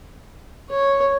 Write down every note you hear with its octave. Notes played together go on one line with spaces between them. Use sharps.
C#5